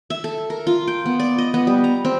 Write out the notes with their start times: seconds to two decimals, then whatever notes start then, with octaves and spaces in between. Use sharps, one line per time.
0.10 E5
0.24 A4
0.50 A#4
0.67 F4
0.88 G5
1.06 B3
1.20 D5
1.38 D#5
1.54 B3
1.67 G3
1.84 A#5
2.05 C4